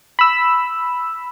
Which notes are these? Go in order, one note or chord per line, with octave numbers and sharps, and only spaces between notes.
B5 E6